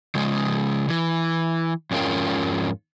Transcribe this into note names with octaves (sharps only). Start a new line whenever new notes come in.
C#3 F3 G#3
E3
F2 G#2 C#4 F4 A#4 G5